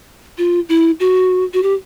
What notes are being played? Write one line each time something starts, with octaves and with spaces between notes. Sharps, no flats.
F4
E4
F#4
F#4
G4